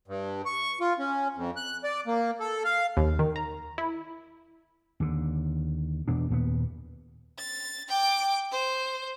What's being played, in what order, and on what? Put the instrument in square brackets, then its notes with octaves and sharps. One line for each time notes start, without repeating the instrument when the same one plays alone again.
[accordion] G2
C#6
F4
C#4
F2
F#6
D5
A#3
A4
F5
[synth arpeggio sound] D#2
D#3
A#5
E4
[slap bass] D#2 D3
E2 B2 D4
D#2 A#2 A#3 B3
[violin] A6
G5 D6
C5